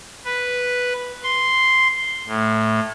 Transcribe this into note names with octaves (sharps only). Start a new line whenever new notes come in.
B4
C6
A2